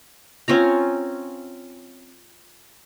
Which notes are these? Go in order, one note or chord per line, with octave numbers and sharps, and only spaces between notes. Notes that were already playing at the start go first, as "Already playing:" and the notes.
C4 C#4 F4 A#5